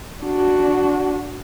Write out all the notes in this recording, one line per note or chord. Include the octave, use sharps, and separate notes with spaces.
D4 F#4